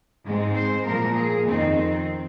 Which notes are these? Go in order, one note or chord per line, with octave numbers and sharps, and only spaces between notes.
G#2 G#3 C4
C5
A#2 F3 A#3 A#4
G#4
F2 D#3 C4 D#4
C4